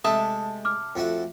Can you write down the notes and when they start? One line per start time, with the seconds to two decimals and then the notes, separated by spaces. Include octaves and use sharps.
0.04 C3 G#3 A3 E5 A5 D#6
0.65 D6 F6
0.96 F2 A3 F#4